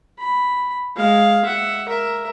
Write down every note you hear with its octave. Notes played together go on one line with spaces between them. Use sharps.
B5
G#3 F5
E5 F#5
A#4 E5